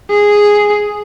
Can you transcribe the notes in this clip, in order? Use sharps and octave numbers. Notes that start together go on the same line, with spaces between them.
G#4